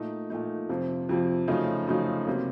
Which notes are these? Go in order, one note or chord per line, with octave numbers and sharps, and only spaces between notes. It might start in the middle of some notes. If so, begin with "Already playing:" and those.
Already playing: A#2 A3 D#4
A#2 A3 D#4
F2 C3 F3
F2 C3 F3
F#2 C#3 F3 A3 D#4
F#2 C#3 F3 A3 D#4
C3 F#3 A#3